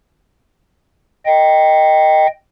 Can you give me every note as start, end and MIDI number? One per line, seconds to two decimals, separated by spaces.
1.26 2.27 75
1.26 2.27 79